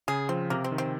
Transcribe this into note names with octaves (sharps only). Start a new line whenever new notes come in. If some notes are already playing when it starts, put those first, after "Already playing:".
C#3 G#4
F3 C4
C3 A#3
C4
D#3
C4